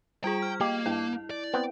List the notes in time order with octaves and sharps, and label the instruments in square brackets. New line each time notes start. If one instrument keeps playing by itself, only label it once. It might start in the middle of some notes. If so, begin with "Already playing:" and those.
[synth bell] G3 F4 G#4 [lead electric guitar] G5
[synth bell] F6
[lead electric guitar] A#3 [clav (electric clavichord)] G4 [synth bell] D#5
[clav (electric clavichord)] G2 [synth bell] E4
[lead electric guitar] D5
[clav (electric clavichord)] B3 C4